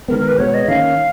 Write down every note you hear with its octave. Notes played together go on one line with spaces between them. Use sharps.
D#3 G#3 B3 A#4
A#4
B4
B2 G#3 B3 C#5
D#5
D#3 A#3 C#4 F5